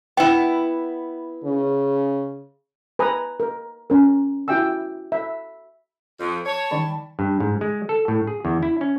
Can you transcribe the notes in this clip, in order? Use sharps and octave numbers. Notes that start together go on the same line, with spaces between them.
B3 E4 G5
C#3
B4 G#5 A#5 D#6
A#4
C#4 A#4
E4 F#4 E5 G5 G#5 E6
E5
F2 C5
C#5 A5
D#3 D5 B5
G2
G#2
G#3
A4
A2
G#4
E2
E4
C#4